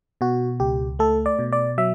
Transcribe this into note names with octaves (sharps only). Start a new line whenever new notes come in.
B2 F#4
C#2 G4
A3 A4
D5
B2
D5
F#3 E5